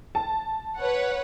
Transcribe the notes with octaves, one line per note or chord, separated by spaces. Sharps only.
A5
B4 C#5 F#5